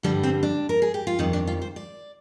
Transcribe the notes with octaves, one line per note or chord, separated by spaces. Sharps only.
G2 D3 G3 D4
C4
D4
A#4
G#4
G4
F4
F2 D#3 G3 D#4
D4
F4
C5
D5